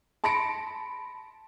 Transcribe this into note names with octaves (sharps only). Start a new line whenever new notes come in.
A5 B5 C6 A#6 C#7 D7